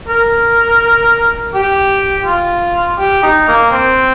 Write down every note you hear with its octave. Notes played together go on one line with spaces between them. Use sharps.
A#4
G4
F4
G4
D#4
A#3
C4